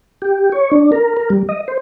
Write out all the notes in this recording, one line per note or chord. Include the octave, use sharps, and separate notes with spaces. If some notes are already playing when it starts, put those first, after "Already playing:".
G4
C#5
D4
A#4
A#4
G3
D#5
C5